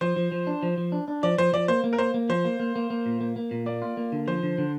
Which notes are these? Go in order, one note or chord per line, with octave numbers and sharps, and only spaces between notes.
F3 C5
F3
F3
D4
F3
F3
D4
D4
F3 D5
F3 C5
F3 D5
A#3 C5
A#3
A#4
A#3 C5
A#3
F3 C5
A#3
A#3
A#3
A#3
A#2
A#3
A#3
A#2
A#3 D5
F4
A#3
D3
F3 C5
D3
D3